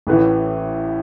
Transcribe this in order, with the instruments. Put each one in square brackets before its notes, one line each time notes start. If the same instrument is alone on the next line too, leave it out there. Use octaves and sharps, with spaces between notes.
[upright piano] A1 A2 E3 B4